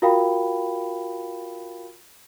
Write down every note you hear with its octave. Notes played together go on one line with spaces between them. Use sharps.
F4 F#4 A#4 F5 G5 B5